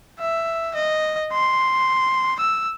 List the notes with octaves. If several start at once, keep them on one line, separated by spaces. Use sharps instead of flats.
E5
D#5
C6
E6